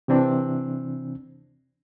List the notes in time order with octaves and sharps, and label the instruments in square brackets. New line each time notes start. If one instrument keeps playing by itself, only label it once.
[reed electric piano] C3 E3 C4 D4